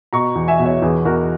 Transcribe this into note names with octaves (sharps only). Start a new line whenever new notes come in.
B2 A#5 C#6
E2
E5 G#5
B2
C#5 E5
E2 G#4 B4
E2 F#4 A#4